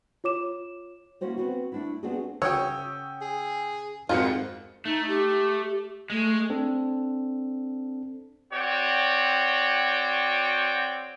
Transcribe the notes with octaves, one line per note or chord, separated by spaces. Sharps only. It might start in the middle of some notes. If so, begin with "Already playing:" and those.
F4 C#5 D6 E7
A#3 C#4 E4 F#4 C5 C#5
B3 C4 F#4 B4
A3 D4 E4
B3 C4 D4 F4 F#4 G#4
C#3 C#4 F#4 C#5 G5 D#6 E6
G#4
F2 G#2 D#3 C4 F4 F#4 D#5 C#7
A3 D#4
G4
G#3 A3
C4 D4 A4
C4 F#4 C#5 D5 G5